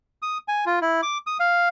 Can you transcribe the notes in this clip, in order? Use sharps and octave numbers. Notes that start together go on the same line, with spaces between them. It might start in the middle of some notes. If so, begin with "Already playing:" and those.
D#6
G#5
F4
E4
D6
D#6
F5